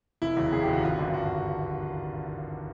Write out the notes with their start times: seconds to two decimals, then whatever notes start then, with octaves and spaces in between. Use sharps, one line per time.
0.22 F1 E4
0.37 D#2 C#3 F#3
0.52 F1 G#4
0.62 G4
0.68 D#2 C#3 F#3
0.73 F#4
0.83 G#1 F4
0.98 G2 D3
1.13 G#1 F#4